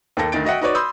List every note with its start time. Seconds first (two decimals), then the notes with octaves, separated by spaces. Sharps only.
0.17 D#2 A#3 A4 A#6
0.32 D2 D#3 A6 D7
0.45 F#4 D#5 E5 F#5 G5
0.61 D#4 F#4 B4 C#5 D5
0.75 B5 C6 D#6 E6 G6